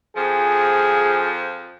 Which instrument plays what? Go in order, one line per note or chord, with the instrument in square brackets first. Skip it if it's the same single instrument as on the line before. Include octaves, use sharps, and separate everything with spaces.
[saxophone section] F2 F3 [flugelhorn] G#4